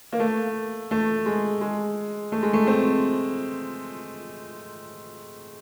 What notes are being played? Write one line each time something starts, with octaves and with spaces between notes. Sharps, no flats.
A#3
A3
A3
G#3
G#3
A3
G#3
A3
C4